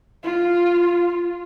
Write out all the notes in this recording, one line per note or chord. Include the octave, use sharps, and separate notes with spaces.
F4